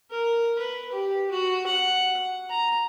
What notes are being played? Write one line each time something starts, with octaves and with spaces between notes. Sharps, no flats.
A#4
B4
G4
F#4
F#5
A#5